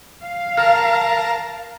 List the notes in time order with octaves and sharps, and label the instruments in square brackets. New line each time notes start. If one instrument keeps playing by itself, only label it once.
[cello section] F5
[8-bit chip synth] A#4 A5 A#5 [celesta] F6